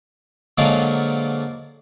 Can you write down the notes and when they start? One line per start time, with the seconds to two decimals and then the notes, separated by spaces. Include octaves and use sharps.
0.58 A#2 D3 F3 F#3 G#3 A#3